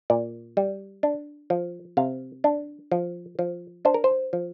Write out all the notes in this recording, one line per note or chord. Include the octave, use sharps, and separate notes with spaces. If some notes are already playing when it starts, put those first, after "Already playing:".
A#2 D5
G3
D4
F3
C3 F5
D4
F3
F3
D4 C5
A#4
C5
F3